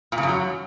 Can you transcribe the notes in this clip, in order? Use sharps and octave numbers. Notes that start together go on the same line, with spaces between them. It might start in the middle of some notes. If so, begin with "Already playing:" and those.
A#2
C#3
F#2
F#3